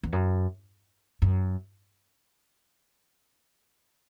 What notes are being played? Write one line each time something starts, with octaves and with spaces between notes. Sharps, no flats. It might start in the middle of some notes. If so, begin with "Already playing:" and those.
E2
F#2
F#2